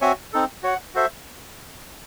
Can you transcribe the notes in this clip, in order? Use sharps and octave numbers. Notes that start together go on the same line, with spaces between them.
C4 F#4 C#5 E5 G#5
C4 D#4 A4
F#4 C#5 F#5
F#4 A4 C5 E5